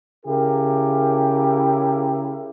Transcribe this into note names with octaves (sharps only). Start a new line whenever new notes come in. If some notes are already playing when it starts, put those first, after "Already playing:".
C#3 E4 G4 A#4